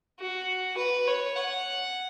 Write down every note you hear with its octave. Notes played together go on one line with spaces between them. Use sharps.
F#4
B4
C#5
F#5